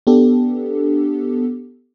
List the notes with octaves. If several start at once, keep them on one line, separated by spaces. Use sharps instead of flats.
B3 D4 G4 A4